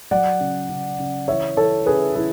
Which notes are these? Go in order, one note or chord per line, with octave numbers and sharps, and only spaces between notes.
F#3 D5 F#5
C#3
C#3
C#3
E3 C#5 E5
E3 A4 C#5
C#3 G#4 B4
E3 E4 G#4